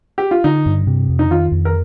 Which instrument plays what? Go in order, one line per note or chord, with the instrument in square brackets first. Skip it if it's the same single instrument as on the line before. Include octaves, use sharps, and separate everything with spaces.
[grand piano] G4
F4
[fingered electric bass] D3 [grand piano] D#4
[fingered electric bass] G2
C3
F2
[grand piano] D#4
[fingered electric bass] D#3 [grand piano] F4
[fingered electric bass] F2
[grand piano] A#4